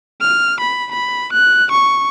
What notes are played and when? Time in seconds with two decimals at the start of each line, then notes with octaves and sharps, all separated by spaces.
0.21 F6
0.60 B5
0.92 B5
1.33 F#6
1.71 C#6